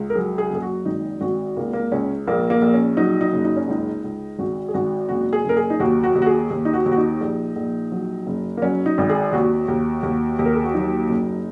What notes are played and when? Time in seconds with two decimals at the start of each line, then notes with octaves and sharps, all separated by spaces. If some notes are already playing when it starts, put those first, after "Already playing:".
Already playing: C#2
0.10 A#4
0.15 F#3 G#4
0.38 G#4
0.50 F#1 G#4
0.62 F#4
0.85 G#1 D#4
1.21 G#1 F#4
1.56 C#2 A#3
1.73 A#3
1.92 C#2 C#4
2.27 A#1 A#3
2.50 A#3
2.62 A#1
2.74 C#4
2.97 F#3 D#4
3.21 D#4
3.33 F#1
3.45 D#4
3.57 C#4
3.68 C#2 D#4
4.04 C#2
4.39 G#1 F#4
4.68 G#4
4.74 G#1 F#4
5.09 F#1 F#4
5.33 G#4
5.45 F#1 A#4
5.57 G#4
5.70 D#4
5.80 D#2 F#4
6.03 F#4
6.15 D#2
6.22 F#4
6.26 G#4
6.50 D#2
6.65 D#4
6.73 F#4
6.86 D#2
6.92 F#4
6.97 D#4
7.21 A#1
7.56 A#1
7.92 F#3
8.27 F#1
8.57 A#3
8.62 F#3 C#4
8.86 D#4
8.98 G#1
9.09 G#4
9.32 D#2 F#4
9.68 D#2
10.03 D#2
10.39 D#2
10.45 A#4
10.55 G#4
10.64 F#4
10.74 F#3 D#4
11.09 F#1